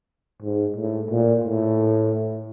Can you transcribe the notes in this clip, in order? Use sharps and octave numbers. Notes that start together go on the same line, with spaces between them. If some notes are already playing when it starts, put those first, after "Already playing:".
G#2
A2
A#2
A2